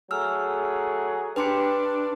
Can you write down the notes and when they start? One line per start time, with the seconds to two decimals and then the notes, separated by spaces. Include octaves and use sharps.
0.11 F#3 A3 G#4 E6 F6
1.36 D4 G4 B4 C6 C#7